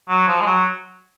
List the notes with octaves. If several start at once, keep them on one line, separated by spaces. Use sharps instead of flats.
F#3
F3
G#3
F#3